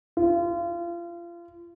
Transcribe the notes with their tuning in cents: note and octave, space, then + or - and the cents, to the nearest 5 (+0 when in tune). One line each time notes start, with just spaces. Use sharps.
F4 -30